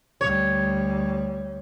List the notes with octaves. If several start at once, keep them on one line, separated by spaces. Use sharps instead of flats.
D2 G3 C#5